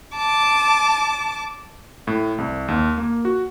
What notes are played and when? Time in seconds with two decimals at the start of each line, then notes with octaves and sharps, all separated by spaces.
0.16 A5 D6
2.07 A2
2.38 C2
2.68 D#2
2.98 A#3
3.25 F#4